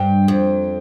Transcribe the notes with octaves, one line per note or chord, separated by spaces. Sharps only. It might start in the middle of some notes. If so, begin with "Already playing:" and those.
Already playing: G2 G5
F2